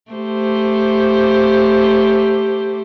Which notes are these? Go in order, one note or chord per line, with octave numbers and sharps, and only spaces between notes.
A3 G4 C5